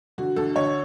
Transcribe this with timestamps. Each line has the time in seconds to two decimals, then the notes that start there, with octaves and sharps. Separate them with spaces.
0.18 D3 F#4
0.36 D2 A4
0.56 D3 C#5